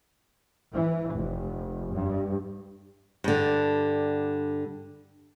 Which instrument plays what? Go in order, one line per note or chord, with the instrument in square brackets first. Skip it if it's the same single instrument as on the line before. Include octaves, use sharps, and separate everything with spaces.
[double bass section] E3
F1
G2
[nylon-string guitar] G2 D3